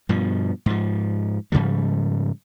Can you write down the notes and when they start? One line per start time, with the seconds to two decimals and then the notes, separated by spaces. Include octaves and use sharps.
0.09 G2 B2 F3
0.66 G#2 F3
1.52 G#2 C#3 F3 G3